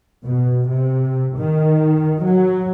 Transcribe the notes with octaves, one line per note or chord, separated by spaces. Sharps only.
B2
C3
D#3
F#3